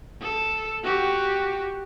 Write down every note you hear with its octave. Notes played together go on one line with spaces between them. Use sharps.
A4
F#4 G4